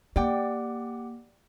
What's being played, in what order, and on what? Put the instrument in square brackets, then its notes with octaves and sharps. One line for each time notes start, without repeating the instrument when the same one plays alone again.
[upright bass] A#3 [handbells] G4 F#5 D6 [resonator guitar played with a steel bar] D5 G5